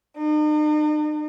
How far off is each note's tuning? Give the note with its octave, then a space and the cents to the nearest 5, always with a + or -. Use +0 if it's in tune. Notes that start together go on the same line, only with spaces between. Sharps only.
D#4 -45